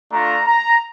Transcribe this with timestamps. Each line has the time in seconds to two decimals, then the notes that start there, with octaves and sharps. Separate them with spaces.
0.11 A3 D4 F4 A#5
0.45 A#5